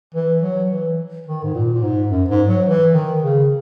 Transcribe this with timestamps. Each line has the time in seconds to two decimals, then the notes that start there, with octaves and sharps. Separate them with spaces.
0.14 E3
0.42 F#3
0.70 E3
1.27 D#3
1.43 G#2
1.55 A#2
1.74 A#2
1.82 G#2
2.10 F#2
2.29 G#2
2.48 F#3
2.66 E3
2.94 D#3
3.23 C#3